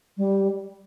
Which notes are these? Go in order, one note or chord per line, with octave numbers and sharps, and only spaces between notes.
G3